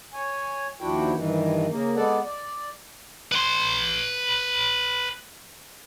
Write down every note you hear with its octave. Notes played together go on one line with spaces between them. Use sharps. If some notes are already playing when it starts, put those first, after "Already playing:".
C#5 G#5
D#2 F3 D4 E4 F#4 G5
G2 D#3 E3
C#3 A#3
G#3 B3 A4 D5 F#5
D5
B4 C6